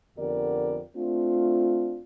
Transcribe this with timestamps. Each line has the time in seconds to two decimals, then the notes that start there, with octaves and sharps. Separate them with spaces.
0.18 F2 D3 B3 G4 A#4 D5
0.97 A3 C4 D4 F4